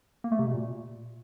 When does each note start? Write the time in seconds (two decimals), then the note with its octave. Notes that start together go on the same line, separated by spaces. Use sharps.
0.24 A#3
0.32 A3
0.39 C3
0.47 B2
0.54 A#2